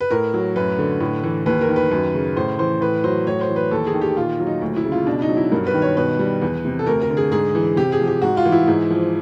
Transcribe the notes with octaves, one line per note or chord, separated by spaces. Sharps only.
B4
A2 A#4
F#3
F#2 B4
D3
A2
E3
D#2 B4
A#4
D#3
B4
F#2
C#3
A2 C5
E3 C5
A2 B4
F#3 C5
A2 C#5
C5
E3
B4
D#2 A4
G#4
D#3
G4
A#2 F4
F#3
D#4
D2
E4
C#3
F4
B2 D4
D#4
F#3
E4
G2 A#4
B4
D#3
C#5
B2 B4
G3
E2
C3
A4
D2 A#4
A#4
D3
G#4
G#2 G#4
E3
C3 G4
G#4
F3
G4
G#2 F#4
F4
E3
E4
G#2 E4
F3